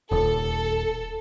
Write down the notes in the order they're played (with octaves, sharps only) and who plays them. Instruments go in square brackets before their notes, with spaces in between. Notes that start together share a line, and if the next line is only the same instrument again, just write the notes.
[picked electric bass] D#1 [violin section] A4